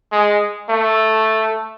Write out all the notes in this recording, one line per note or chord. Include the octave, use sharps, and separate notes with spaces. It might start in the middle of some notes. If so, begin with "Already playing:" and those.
G#3
A3